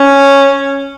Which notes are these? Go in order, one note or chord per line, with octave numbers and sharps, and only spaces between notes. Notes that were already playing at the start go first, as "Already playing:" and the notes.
Already playing: C#4